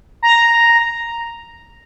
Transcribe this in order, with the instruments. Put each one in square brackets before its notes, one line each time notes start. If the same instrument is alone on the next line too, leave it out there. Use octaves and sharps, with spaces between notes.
[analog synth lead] A#5